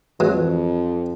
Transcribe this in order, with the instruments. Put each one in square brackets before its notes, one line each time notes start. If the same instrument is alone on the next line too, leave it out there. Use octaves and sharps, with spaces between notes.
[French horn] F2 [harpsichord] E3 F#3 G#3